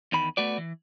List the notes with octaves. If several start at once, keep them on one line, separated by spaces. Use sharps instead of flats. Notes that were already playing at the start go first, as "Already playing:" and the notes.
E2 D#3 B5
A3 B3 F#4 D5
E3